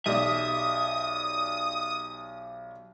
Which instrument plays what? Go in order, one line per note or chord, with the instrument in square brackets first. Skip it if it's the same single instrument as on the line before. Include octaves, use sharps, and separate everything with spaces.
[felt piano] B1 G4 D5 [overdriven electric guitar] E5 [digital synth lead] D#6